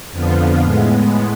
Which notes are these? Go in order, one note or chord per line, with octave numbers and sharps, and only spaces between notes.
F2 D3 F3 B3 F4
A2 G#3 B3